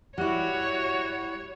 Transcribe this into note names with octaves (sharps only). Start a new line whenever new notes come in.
G3 E4 F#4 C#5 F#5